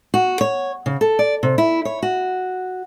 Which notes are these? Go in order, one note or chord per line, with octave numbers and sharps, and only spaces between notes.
F#4
C#5
C#3
A4
D5
C3
E4
C#5
F#4